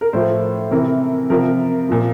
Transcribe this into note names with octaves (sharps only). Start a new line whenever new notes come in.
A#4
A2 F3 C5
C3 E3 A#4
C3 F3 A#4
A#2 F3